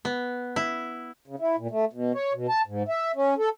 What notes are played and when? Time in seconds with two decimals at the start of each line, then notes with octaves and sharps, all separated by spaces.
0.05 B3
0.56 E4
1.27 C#3
1.39 E4
1.58 A#2
1.71 A3
1.93 B2
2.15 C#5
2.34 B2
2.49 A5
2.66 G#2
2.88 E5
3.16 C#4
3.38 A4